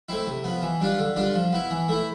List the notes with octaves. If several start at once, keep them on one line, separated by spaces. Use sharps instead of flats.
A3 C4 E4
C3
F3 B3
E3
G3 D4 F4
D3
G3 D4 F4
F3
B3 E4
E3
A3 E4